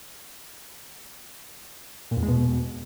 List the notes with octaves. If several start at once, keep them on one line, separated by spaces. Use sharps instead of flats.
A#2
E2
G#3
B2